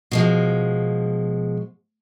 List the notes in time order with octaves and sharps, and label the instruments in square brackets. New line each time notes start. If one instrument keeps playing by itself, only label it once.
[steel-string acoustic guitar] B2 F3 G#3